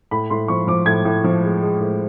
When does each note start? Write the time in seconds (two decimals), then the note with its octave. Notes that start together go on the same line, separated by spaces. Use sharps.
0.11 A2 B5
0.30 A2 C6
0.48 F3 C#6
0.67 F3 D6
0.86 A2 G#6
1.05 A2
1.24 F3
1.43 G#3
1.62 G#3
1.80 A2